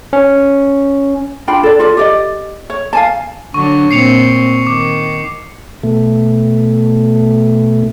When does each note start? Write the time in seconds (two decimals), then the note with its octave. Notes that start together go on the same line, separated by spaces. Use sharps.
0.13 C#4
1.47 D4 F4 G5 B5
1.63 A4 D5
1.79 F4 A4 D5
1.97 G4 D5 D#5
2.70 C#5
2.93 F5 G#5 A5
3.54 D3 F#3 D4 C#6
3.91 A#2 C4 C7 C#7 F7
4.67 D#3 D6
5.83 B2 A3